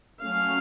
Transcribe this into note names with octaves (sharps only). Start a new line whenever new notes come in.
F#3 A3 C#4 F5